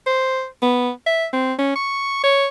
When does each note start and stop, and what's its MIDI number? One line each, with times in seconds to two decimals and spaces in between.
0.07 0.46 72
0.62 0.90 59
1.07 1.26 76
1.33 1.54 60
1.58 1.72 61
1.76 2.23 85
2.24 2.48 73